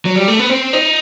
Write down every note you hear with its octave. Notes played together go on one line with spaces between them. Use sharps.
F#3
G3
A3
B3
C4
D#4